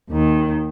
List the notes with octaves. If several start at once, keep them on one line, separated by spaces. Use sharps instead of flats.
D#2 D#3